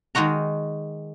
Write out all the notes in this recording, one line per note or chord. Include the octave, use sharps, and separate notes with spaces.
D#3 G#3 D#4 F#4 A#5